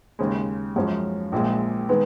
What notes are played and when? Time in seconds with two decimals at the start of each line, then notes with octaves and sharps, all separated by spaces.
0.19 D#2 C#3 G#3
0.76 F#2 F3 G#3 C#4
1.32 A#1 A#2 G#3
1.89 D#3 G#3 B3